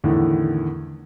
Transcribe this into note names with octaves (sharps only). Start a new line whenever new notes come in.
E2 A2 D3 D#3